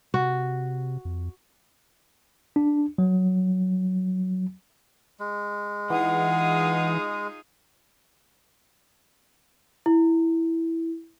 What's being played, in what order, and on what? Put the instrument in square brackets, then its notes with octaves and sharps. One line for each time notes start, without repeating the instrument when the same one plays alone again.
[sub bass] C3 [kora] F#4
[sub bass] F2
[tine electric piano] D4
F#3
[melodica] G#3
[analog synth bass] E3 [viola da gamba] D#4 F4 G#4 [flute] F#5
[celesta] E4